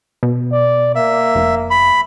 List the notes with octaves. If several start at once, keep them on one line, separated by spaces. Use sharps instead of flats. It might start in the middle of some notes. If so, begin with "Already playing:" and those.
B2
D5
A#3 E5
F1
B5